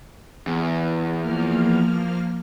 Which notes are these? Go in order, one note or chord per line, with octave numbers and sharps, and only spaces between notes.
E2
F3 A#3 F6